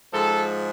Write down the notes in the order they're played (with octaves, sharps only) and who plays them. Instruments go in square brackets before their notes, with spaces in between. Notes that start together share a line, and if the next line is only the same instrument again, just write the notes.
[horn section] G#2 F3 G#3 A4